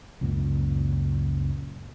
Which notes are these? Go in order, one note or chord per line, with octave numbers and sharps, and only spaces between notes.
C#2 F#2 A#2